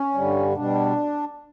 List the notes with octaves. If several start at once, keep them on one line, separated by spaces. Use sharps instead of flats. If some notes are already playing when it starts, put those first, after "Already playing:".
Already playing: C#4
G2 D3 G3
B2 G3 D4